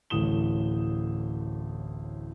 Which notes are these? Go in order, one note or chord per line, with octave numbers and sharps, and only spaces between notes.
D1 A1 A2 D#6 E7 G7